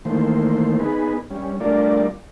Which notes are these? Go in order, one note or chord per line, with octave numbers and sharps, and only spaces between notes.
D#3 E3 A3 A#3 C5
B3 D#4 G#4 B4
G3 C#4
G3 A3 D4 F4 A#4 D5